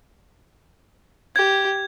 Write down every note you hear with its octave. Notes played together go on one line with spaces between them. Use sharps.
G4 G#6